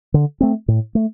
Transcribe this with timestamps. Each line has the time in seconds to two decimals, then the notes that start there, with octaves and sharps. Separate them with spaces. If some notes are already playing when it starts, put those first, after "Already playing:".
0.14 D3
0.41 A3 C4
0.68 A2
0.95 A3